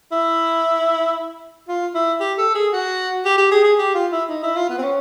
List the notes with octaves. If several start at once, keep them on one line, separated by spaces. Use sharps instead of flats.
E4
F4
E4
G4
A4
G#4
F#4
G4
G4
G#4
G#4
G4
F4
E4
D#4
E4
F4
B3
C4
C#4